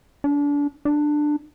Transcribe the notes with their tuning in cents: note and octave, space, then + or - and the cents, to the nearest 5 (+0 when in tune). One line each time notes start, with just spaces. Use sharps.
D4 -30
D4 +15